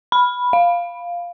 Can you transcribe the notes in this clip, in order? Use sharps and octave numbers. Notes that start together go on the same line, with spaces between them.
B5
F5